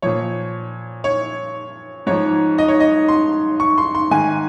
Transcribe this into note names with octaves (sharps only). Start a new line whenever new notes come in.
A#2 F3 C#5
C#5
G#2 F3 C#5
D#5
C#5
D#5
C6
C#6
C6
C6
G#2 D#3 G#5